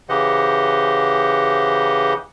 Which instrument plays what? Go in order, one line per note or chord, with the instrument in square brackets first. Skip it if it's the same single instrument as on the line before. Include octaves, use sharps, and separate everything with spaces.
[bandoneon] C#3 E3 G4 C5 D#5 F#5